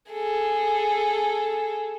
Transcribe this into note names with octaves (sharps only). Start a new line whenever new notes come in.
G#4 A4